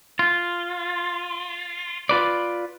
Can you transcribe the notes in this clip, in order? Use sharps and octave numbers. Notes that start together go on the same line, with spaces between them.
F4
F4 B4 D5